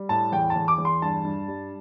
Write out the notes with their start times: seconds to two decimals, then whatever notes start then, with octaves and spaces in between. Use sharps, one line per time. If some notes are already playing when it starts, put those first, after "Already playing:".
Already playing: G3
0.09 A2 A5
0.32 E2 G5
0.50 A5
0.56 E2
0.68 D6
0.78 E2
0.85 C6
1.02 G2 A5
1.25 G2
1.48 G3